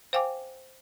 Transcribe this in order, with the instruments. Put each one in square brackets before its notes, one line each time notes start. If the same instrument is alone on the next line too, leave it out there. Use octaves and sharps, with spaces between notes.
[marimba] C5 F5 G5 G#5 D6